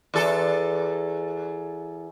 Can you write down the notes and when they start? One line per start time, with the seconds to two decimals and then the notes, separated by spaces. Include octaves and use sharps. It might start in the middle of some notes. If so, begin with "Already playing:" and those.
0.14 E2 A4